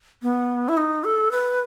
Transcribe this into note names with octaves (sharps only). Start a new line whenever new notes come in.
B3
E4
D#4
A4
B4